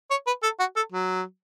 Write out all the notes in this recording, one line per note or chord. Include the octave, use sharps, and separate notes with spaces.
C#5
B4
A4
F#4
A4
F#3